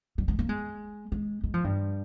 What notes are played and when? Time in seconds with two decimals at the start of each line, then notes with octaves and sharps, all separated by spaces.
0.18 G3
0.28 G#3
0.39 A#3
0.49 G#3
1.12 G#3
1.44 G#3
1.54 F3
1.64 G2